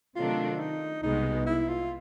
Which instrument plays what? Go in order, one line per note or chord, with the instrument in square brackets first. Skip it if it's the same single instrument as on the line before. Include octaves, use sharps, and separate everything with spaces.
[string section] C3 D#3 F#3 A3 D4 [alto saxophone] F4
[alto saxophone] D#4
[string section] C2 B2 G#3 B3 [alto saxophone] D#4
[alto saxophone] E4
F4